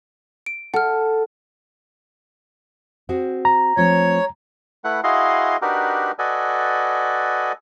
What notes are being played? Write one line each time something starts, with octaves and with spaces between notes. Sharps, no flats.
D7
A4 F#5 F6
C4 F#4 G#4
A#5
F3 A3 C4 C#5
A3 E4 B4 F#5
E4 F#4 G#4 D#5 F5 C6
D4 D#4 F#4 G4 A#4 B4
F#4 A4 B4 D5 D#5 G#5